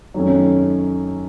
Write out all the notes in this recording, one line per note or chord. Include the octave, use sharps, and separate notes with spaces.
F#2 D#3 A3 C#4